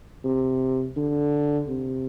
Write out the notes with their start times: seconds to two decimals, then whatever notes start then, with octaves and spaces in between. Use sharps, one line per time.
0.25 C3
0.97 D3
1.69 C3